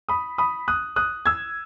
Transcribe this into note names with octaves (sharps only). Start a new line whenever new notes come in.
B5 D#6
B5 D#6
D#6 F#6
D#6 F#6
E6 G#6